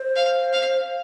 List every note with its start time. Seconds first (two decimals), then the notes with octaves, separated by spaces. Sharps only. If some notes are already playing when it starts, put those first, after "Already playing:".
Already playing: C5
0.16 F5
0.53 F5